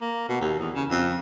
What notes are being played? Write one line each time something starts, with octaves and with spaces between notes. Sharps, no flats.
A#3
B2
D#2
E2
C#3
F2